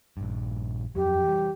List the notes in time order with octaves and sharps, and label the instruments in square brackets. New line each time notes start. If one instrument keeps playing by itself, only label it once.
[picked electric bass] A#1 G2
[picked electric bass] F2 F#3 [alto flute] G4
[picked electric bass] E3 G3